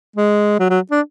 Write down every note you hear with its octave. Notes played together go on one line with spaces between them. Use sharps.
G#3
F#3
F#3
D4